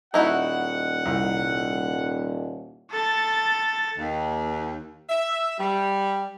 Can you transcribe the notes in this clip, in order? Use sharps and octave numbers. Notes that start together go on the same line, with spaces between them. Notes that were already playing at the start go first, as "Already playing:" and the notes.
D#1 D#4 E4 F#4 F#5
C2
A4 A6
D#2
E5
G3